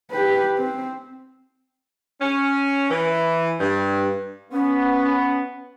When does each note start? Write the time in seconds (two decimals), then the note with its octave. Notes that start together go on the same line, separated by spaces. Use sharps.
0.11 G4 B4
0.58 C4
2.21 C#4
2.91 E3
3.60 G2
4.52 B3 C#4